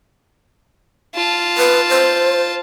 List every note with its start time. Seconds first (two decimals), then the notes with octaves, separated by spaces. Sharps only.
1.15 F4 A5
1.58 B4
1.90 C5